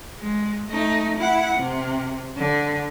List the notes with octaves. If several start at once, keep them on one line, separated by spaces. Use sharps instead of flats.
G#3
A3 D#4
E4 F#5
C3
D3